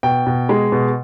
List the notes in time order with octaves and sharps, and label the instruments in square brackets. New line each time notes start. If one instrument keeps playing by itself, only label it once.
[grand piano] B2 G5
B2
G#3
B2